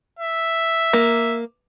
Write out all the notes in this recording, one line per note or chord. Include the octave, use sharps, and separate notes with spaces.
E5
A#3